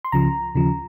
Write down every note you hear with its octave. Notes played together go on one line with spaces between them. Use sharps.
C6
C#2 C#3 F3 A#5
D#2 C#3 F3